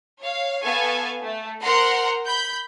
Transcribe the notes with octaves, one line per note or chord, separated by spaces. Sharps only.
C#5 F5
B3 A4 F5 G#5 C#6
A3
A#4 C5 F#5 A#5 C6
B5 G6